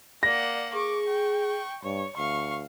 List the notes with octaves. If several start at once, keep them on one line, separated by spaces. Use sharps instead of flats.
A#3 D5 F#5 A#6
G#4 C#6 D6
G5
G2 C#5
D2 F5 C#6